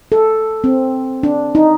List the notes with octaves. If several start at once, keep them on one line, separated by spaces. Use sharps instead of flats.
A4
C4
D4
D#4